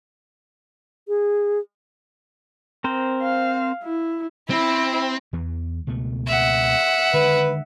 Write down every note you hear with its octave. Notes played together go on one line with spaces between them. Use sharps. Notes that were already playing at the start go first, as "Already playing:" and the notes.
G#4
C4 A#4 C5
F5
E4
C4 E4
E2 E3
C#2 B2 A3
E5 F#5
D3 D#3 G#3 B4